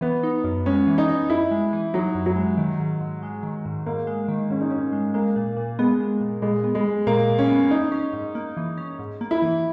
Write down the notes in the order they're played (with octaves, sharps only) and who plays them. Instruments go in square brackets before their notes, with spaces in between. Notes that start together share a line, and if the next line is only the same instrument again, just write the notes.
[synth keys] E3 [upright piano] B3
[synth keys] D#4
F#2
[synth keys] G#3 [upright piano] C#4
[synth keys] E3
[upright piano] D#4
[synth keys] D#4
[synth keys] F#2 [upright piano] E4
[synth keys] G#3
E3
[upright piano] F#3 [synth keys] D#4
[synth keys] F#2
[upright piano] F#3
[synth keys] G#3
D#3
G#2
G#2
G#3
D#3
G#2
[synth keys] G#2 [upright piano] A#3
[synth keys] G#3
D#3
[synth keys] G#2 [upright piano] C#4
[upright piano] D#4
[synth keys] G#2 [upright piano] C#4
[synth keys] G#3
[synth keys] G#3 [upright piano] A#3
[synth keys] A#2
A#2
[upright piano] G#3 [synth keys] B3
[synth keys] G#3
A#2
[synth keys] A#2 [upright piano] G#3
[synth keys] B3
[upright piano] G#3
[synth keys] G#3
[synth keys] A#2 [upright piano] A#3
[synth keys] A#2
[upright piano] C#4
[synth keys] B3
[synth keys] E3 [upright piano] D#4
[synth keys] C#4
G#2
A#3
E3
C#4
G#2
A#3
[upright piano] E4
[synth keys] E3